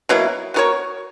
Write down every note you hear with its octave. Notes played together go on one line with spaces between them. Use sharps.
B2 F#3 A#3 E4
B3 F#4 A#4 C#5